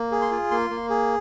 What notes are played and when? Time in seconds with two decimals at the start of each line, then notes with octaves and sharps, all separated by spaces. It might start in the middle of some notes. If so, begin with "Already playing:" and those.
Already playing: A#3
0.11 G#4
0.22 C6
0.31 F4
0.51 A#3 C6
0.70 A#3
0.90 G#4